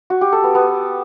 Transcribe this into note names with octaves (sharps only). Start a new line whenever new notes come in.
F#4
G4
A4
B3
B3